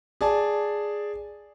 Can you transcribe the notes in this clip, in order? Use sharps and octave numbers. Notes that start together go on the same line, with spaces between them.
G#4 D5 A5